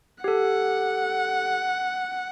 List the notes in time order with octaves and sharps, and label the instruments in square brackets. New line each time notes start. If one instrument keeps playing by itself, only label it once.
[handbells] G4 A4 [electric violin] F#5